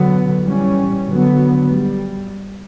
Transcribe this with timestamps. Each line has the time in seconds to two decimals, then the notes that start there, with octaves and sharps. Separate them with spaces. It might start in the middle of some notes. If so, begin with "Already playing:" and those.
Already playing: D3 F#3 B3
0.42 E3 G3 C#4
1.07 D3 F#3 B3
1.71 G3